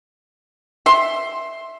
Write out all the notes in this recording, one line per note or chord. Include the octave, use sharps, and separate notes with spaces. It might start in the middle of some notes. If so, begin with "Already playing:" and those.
E5 C6